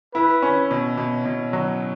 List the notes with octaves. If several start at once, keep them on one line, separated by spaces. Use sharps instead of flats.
E4 B4
C#4
B2
B2
B2
F#3